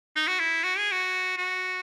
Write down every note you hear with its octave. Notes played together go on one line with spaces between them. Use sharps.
D#4
F#4
E4
F#4
G#4
F#4
F#4